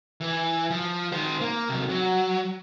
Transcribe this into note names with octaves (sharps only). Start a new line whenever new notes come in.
E3
F3
D#3 C5
A#3
C3 F#3
F#3